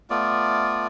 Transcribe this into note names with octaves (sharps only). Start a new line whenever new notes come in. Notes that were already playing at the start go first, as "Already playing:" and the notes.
A3 B3 F4 D5